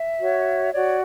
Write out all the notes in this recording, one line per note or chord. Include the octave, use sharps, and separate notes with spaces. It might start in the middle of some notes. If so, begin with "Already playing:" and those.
Already playing: E5
F#4 C#5
F#4 C#5 D5